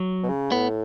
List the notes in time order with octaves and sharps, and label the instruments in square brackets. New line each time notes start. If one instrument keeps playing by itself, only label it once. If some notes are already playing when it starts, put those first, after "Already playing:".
Already playing: [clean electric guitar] F#3
[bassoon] B2
C#3
[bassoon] A2 [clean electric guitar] B3